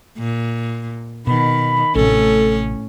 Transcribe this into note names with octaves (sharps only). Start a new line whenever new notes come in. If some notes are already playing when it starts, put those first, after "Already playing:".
A#2
B2 D#3 B5
A1 A2 C3 C#4 A4